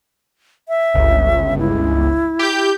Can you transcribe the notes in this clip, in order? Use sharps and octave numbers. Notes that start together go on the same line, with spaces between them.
E5
G1 C#2
E4
G4 G6